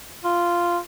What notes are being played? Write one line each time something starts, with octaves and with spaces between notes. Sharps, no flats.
F4